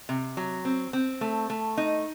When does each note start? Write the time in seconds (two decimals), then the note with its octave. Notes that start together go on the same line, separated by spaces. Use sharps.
0.09 C3
0.37 F#3
0.65 C4
0.93 C4
1.21 A3
1.50 A3
1.77 D#4